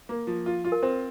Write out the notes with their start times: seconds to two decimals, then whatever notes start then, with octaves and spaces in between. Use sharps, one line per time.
0.09 A#3
0.27 F3
0.46 F4
0.64 F4
0.72 A#4
0.83 C4 C5